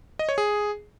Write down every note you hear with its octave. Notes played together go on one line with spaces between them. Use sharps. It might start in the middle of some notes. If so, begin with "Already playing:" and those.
D#5
C#5
G#4